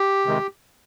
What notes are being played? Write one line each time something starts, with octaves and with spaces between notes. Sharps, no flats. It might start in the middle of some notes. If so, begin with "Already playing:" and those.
Already playing: G4
C3 D#3 G#3